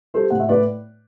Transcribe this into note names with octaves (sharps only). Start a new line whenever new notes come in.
G3 A4 C5
A2 F#5
E5
A2 B4 D5